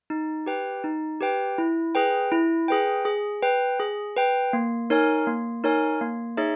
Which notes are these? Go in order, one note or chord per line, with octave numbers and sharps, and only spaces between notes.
D#4
G4 B4 G5
D#4
G4 B4 G5
E4
G#4 B4 G5
E4
G#4 B4 G5
G#4
B4 G5
G#4
B4 G5
A#3
D#4 A#4 C#5 G#5
A#3
D#4 A#4 C#5 G#5
A#3
D#4 G#4 C#5 E5